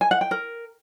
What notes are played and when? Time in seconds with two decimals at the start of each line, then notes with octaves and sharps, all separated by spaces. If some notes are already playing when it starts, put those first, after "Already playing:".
0.01 G#5
0.11 F#5
0.21 G5
0.31 A#4